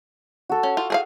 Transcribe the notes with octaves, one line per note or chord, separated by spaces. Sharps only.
F#4 A4
C#4
F4
G#4 A#4 F5